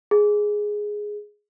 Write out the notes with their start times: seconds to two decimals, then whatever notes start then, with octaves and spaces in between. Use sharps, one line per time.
0.11 G#4